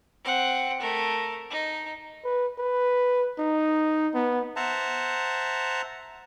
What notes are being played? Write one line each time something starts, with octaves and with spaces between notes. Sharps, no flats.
C4 F#5
A3 A#4
D#4
B4
B4
D#4
B3
C5 E5 F#5 A5 A#5